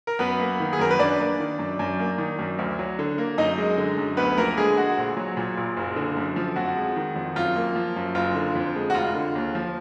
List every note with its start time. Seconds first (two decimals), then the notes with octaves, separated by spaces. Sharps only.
0.07 A#4
0.19 F#2 B3 B4
0.39 A#3
0.60 D#3
0.73 G#4
0.79 F#2 A#4
0.90 B4
0.99 F#2 D4 D5
1.20 A#3
1.40 D#3
1.59 F#2
1.79 F#2
1.99 A#3
2.18 D#3
2.39 F#2
2.59 D2
2.79 F#3
2.99 D3
3.18 A#3
3.38 F#2 D#4 D#5
3.58 G#3
3.77 D3
3.98 F#2
4.17 D2 B3 B4
4.38 F3 A#3 A#4
4.57 D3 G#3 G#4
4.77 G#3 F#4
4.98 A#1
5.17 F#3
5.37 A#2
5.57 A#1
5.77 F#1
5.96 D3
6.17 F#2
6.36 F3
6.56 F2 F#4
6.76 G#3
6.96 D#3
7.16 F2
7.36 F#2 F4
7.56 A#3
7.76 F3
7.96 F#2
8.15 F#1 F4
8.35 D3
8.55 F2
8.76 G#3
8.90 F#4
8.95 F1 F4
9.14 D3
9.35 D#2
9.55 F3